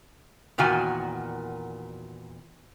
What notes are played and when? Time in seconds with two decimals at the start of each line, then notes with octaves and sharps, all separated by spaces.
0.58 E2 A#2 D#3 F#4 G#5